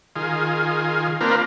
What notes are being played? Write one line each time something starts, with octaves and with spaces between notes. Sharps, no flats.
D#3 F4 G#4
A#3 C4 D4 F4 A#4 B4